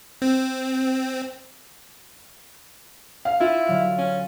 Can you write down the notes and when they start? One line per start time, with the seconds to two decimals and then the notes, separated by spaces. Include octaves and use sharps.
0.22 C4
3.25 F5
3.40 E4 F4
3.66 D3 F#3 F5
3.98 C#4